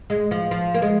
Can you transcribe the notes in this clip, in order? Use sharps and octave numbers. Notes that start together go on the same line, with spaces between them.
G#3
F3
F3
A#3
G#3